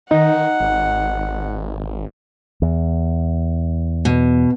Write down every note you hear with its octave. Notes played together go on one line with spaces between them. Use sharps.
D#3 D#4 F#5
G#1
E2
B2